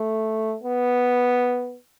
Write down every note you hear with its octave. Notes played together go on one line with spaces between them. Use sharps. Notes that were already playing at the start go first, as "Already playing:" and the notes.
Already playing: A3
B3